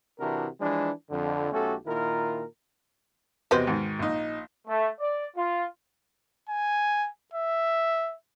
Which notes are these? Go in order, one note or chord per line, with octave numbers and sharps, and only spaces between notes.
C3 E3 D4 E4 F#4 A#4
E3 F3 G#3 D4
F2 D3
B1 A3 C#4 F#4 G4 A4
A#2 D#3 E4 F4 A#4
E2 C3 F#4 B4 C5 D#5
G#2 D#3
A#1 D#4
A3
D5
F4
G#5
E5